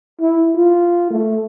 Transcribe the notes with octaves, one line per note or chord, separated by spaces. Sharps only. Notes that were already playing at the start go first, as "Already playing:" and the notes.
E4
F4
A3